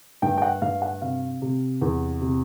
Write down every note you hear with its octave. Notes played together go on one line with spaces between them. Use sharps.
G2 G5
G5
F#5
G2 F5
F#5
C3 F5
C3
E2
C3